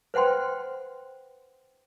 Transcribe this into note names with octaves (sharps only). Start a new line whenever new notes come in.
B4 C5 F#5 G5 C6